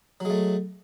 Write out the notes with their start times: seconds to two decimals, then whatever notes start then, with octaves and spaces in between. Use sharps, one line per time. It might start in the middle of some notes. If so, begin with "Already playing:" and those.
0.20 F#3
0.25 G#3
0.30 A3